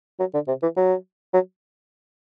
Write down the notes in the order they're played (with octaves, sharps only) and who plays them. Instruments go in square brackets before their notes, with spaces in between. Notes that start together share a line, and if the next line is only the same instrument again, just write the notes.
[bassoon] F#3
D3
C3
E3
F#3
F#3